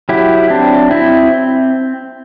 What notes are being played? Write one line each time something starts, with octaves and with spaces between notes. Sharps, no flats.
F#3 E4 G4
C4 D4
C4 E4